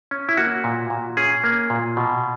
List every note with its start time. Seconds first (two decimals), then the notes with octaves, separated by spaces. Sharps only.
0.11 C#4
0.29 E4
0.37 A#3 F#4
0.64 A#2
0.90 A#2
1.17 C#4 G#4
1.44 A#3
1.70 A#2
1.97 B2